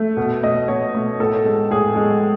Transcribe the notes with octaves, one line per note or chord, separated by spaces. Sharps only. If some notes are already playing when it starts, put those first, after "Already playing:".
Already playing: A3
B2
A3 D#5
B2 C#5
A3
A2 A4
G#3
A2 G#4
G#3